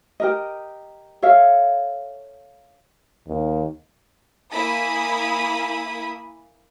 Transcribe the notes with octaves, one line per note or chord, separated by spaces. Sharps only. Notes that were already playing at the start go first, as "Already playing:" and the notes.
G4 A#4 D#5
A4 C#5 E5 F5
D#2
A#3 E4 G#5 B5 D#6